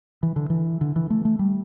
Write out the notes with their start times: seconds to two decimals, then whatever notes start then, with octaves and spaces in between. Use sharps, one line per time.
0.23 E3
0.36 D3
0.50 E3
0.81 D3
0.96 E3
1.10 A3
1.25 A3
1.39 G3